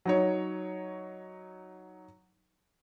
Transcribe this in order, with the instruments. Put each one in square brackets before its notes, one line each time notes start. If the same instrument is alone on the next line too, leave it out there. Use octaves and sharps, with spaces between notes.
[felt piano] F#3 D#4 C#5